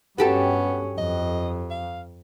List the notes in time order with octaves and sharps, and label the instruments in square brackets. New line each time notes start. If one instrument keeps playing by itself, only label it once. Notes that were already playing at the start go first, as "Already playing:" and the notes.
[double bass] G2 C#4 [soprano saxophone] B3 [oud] F#4 G4 A4
[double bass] F2 [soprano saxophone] D#5
[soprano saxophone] F5